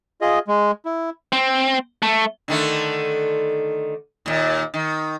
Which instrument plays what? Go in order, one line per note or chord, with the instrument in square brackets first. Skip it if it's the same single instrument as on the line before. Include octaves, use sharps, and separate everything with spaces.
[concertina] F4 G#4 D#5
G#3
E4
[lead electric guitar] C4
A3
[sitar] D3 D#3 A3
D#2 A#2
D#3